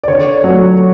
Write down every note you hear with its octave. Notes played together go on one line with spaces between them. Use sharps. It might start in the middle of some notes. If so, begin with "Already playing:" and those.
D5
D3 C#5
F#3 A3